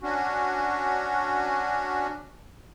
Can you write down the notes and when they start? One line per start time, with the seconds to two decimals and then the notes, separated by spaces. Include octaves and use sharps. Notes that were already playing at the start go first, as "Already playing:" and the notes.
0.01 C#4 D4 F#4